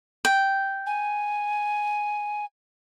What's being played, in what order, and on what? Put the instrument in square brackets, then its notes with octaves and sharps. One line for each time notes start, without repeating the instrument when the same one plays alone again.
[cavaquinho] G5
[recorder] G#5